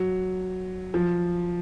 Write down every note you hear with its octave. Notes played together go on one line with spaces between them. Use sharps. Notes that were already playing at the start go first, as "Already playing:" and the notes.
Already playing: F#3
F3